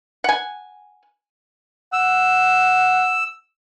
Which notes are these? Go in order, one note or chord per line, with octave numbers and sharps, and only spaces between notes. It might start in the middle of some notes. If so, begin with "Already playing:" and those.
F#5 G#5
F#5 E6